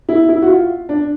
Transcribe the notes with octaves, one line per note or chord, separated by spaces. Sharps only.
E4
E4
F#4
F4
D4